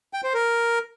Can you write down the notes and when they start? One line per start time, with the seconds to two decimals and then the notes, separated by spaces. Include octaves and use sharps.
0.13 G5
0.24 C5
0.34 A#4